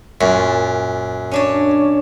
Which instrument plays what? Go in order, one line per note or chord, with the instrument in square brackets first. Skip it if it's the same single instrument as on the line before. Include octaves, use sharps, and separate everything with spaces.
[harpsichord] F#2 [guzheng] A#2
[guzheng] C#4 D4 C#5